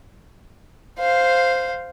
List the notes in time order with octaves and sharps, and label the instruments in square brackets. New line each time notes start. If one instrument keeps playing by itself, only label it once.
[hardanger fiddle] C5 F5